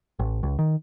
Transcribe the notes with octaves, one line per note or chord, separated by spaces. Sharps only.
A1
C#2
D#3